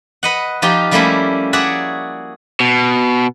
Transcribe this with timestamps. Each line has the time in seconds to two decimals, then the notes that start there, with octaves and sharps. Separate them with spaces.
0.23 B4 D#5 F#5
0.62 F3 D#4 F4 G4
0.91 F3 G3 A3 A#3 C#4 E4
1.53 F#4 G#4 C#5 D5 E5 F#5
2.60 B2